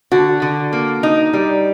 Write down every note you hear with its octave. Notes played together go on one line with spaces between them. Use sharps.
D3 F#4
D3
A#3
D#4
G3